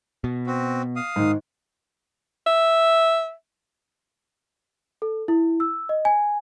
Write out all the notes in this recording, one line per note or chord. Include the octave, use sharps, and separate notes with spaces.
B2
C4 F#4
F5 D#6
G#2 D#3
E5
A4
E4
E6
D#5
G#5